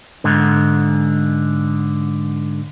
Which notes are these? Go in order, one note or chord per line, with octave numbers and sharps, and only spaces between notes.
G#2 D3